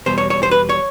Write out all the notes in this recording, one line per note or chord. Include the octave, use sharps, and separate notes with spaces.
E2 B2 G3 C5
C#5
C#5
C5
B4
C#5